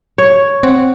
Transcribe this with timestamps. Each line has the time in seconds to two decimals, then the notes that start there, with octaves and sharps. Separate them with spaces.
0.18 C#5
0.63 C4 F#5